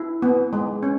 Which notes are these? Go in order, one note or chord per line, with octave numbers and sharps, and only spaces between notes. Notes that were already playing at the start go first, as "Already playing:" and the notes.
Already playing: E4
B3
G#3
C#4